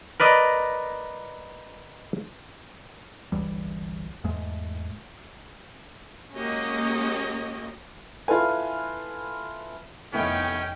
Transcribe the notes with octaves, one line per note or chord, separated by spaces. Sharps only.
A#4 B4 D5 D#5
G1 C#2 E3 G3
E2 G#2 G#3 A3
G#3 A#3 C#4 F#4 G4 D#5
E4 F4 A4 B4 G#5
F1 D#3 A3 B3 C#4 E4 G5